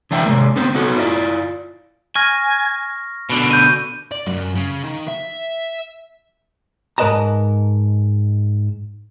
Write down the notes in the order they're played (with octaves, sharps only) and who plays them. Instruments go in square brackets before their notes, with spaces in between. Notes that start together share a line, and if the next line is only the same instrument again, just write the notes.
[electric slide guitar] D3 E3 D4 E5 G5
C3 G#3 A#3
D3 B3 C4 C5
B3 D#4 F#4 A4 C#5
D4 E4 F4 D5
[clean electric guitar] G#5 [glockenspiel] C#6 F6 A#6
[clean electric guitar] B2 D3
[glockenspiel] G6 D#7
[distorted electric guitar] D5
F#2
C#3
D#3
E5
[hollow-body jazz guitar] G#2 A#4 B4 D#5 A5 A#5